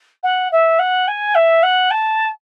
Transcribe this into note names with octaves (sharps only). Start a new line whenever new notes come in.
F#5
E5
F#5
G#5
E5
F#5
A5